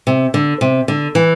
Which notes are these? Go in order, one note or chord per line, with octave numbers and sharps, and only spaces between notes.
C3
D3
C3
D3
E3